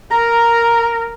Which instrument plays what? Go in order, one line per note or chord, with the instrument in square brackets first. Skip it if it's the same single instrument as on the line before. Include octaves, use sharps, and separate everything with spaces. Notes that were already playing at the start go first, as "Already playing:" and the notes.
[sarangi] A#4 [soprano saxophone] A#5